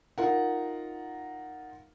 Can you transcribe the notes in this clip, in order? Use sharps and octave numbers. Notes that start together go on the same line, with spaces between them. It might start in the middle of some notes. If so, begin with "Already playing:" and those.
D#4 F4 A#4 F#5